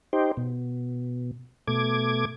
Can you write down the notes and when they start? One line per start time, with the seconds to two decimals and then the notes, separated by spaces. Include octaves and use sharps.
0.13 D#4 G4 C5
0.37 B2
1.67 B2 A3 D6 G#6